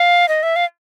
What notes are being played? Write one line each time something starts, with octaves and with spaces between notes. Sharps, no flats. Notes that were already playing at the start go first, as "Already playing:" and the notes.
Already playing: F5
D#5
E5
F5